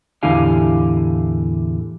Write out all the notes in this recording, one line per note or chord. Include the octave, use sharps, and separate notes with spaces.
E2 A2 D3 G4 F5 G#5